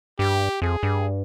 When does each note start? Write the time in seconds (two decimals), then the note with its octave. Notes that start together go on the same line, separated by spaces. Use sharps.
0.19 G2 G4
0.62 F2 G#4
0.83 G2